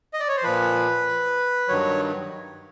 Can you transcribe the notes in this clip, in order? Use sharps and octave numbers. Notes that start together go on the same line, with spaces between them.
D#5
D5
C#5
C5
A#2 F3 B4
G2 D#3 F#3 C#5